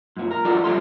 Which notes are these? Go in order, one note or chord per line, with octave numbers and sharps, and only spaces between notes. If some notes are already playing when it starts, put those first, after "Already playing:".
F#2 A#2
A#4
F#3 F4 F#4 A4 D5
C2 F3 G3 A3 C6